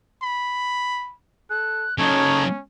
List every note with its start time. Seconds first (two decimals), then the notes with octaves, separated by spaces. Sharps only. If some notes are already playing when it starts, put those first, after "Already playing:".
0.22 B5
1.50 A4 F#6
1.98 C#3 F#3 C#4 D#4 A4 C#5 G#6